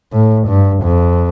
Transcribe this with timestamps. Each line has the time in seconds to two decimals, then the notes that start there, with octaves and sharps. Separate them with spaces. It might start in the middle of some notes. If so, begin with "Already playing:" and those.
0.13 A2
0.48 G2
0.83 F2